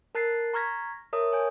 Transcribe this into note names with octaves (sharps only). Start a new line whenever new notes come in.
A#4 A5 F#6 A6 C7
A#5 C#6 F6 G#6 A#6 B6
A#4 C#5 E5 A5 D#6
C#5 G#5 G6